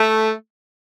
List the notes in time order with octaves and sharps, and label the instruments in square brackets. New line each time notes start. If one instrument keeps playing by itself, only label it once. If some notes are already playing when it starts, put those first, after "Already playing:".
Already playing: [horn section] A3